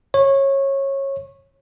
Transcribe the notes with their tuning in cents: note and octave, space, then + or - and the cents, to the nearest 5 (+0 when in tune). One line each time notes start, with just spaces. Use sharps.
C#5 -20